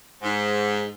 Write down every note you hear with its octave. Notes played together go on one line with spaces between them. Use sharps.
G#2